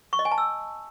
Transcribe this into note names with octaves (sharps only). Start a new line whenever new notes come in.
C#6
D#5
G#5
A5
E6